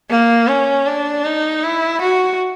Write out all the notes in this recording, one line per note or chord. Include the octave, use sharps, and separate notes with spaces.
A#3
C#4
D4
D#4
E4
F#4